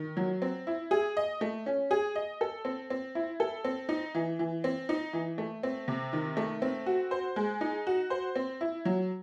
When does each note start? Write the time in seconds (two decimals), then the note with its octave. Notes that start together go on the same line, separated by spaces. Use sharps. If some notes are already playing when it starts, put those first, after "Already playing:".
Already playing: D#3
0.17 F#3
0.42 C4
0.67 E4
0.91 G#4
1.17 D#5
1.41 A3
1.66 C#4
1.91 G#4
2.15 D#5
2.41 A4
2.65 C4
2.90 C4
3.15 E4
3.40 A4
3.64 C4
3.89 D#4
4.15 E3
4.39 E3
4.64 C4
4.89 D#4
5.13 E3
5.38 A3
5.63 C4
5.88 C3
6.13 D#3
6.37 A3
6.62 C4
6.86 F#4
7.11 C5
7.36 G#3
7.61 D#4
7.87 F#4
8.10 C5
8.36 C4
8.61 E4
8.85 F#3